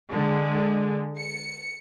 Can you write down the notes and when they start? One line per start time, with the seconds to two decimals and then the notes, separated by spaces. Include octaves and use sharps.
0.10 D3 G#3
1.18 C#7